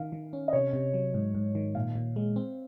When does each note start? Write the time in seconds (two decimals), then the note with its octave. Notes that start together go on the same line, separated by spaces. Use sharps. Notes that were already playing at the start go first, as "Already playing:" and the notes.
Already playing: D#3 F5
0.12 D#3
0.33 C#4
0.48 D#5
0.53 C3 C#5
0.73 C3
0.94 F#3
1.14 G#2
1.35 G#2
1.55 D#3
1.75 A#2 F5
1.96 A#2
2.16 G#3
2.36 C4